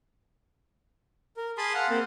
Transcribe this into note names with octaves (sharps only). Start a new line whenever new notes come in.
A#4
G#4 A5 B5 C6 D#6
F5 F#5
A#3 C4 C5